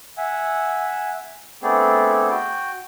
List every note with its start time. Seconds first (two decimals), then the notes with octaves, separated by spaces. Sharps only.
0.17 E5 F#5 G#5
1.63 A3 B3 C4 D4 G#4 A4
2.30 F#4 G5